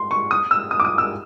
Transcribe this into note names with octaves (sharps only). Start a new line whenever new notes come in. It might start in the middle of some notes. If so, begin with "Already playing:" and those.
Already playing: C6
C#6
D#6
E6
D#6
D6
D#6
E6